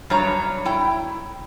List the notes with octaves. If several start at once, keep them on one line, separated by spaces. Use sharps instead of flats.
G2 F#3 C#5 A#5
E4 G5